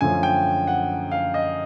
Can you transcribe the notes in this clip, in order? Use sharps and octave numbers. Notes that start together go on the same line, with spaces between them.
F#2 D3 F3 A3 C#4 G#5
G5
F#5
F5
D#5